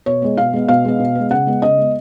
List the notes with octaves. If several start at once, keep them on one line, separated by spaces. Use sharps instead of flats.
B2 C#5
G#3 B3
B2 F5
G#3 B3
B2 F5
G#3 B3
B2
G#3 B3
C#3 F#5
G#3 B3
C#3 D#5
G#3 B3